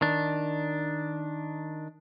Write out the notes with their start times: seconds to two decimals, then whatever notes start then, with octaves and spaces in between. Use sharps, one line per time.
0.01 D#3 D4